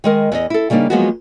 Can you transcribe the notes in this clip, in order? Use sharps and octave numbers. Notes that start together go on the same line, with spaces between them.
D#3 G#3 A#4
E2 D#5
E4 A4
C#3 G3 A#3 D4 D#4
F3 F#3 G#3 A#3 B3 F#4